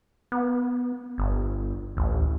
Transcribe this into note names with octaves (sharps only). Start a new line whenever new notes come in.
B3
G1
A1 D2